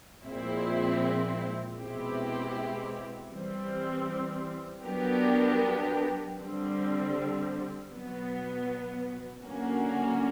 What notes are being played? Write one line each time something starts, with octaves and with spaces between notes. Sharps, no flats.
A#2 F3 G#3 C4 E4
B2 G#3 C4 E4 G4
E3 G3 C4
F#3 B3 D4 G4 A#4
D3 G3 C4
B2 F#3 B3
D3 F#3 A#3 C#4 F#4